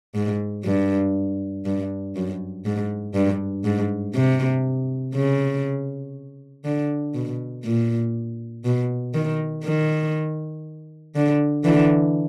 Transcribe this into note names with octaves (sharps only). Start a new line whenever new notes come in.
G#2
G2
G2
F#2
G#2
G2
G#2
C3
C#3
D3
B2
A#2
B2
D#3
D#3
D3
D3 E3